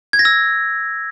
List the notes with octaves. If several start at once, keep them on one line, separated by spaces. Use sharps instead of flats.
G#6
A#6
E6